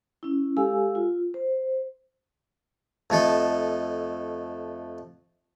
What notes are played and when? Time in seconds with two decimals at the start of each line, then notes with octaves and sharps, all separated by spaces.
0.23 C#4 E4
0.57 G#3 G4 A4 F5 G#5 E6
0.95 F4
1.34 C5
3.10 F2 A3 A4 D#5